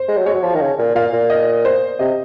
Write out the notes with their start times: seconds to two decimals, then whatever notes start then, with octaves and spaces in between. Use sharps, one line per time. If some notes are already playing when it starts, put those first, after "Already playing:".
Already playing: C5
0.08 G#3
0.17 F#3
0.26 G#3 C#5
0.34 F#3
0.43 F3
0.55 D#3
0.61 C#3
0.78 A#2
0.95 A#2 F5
1.13 A#2
1.30 D#5
1.65 C5
1.99 C3 D#5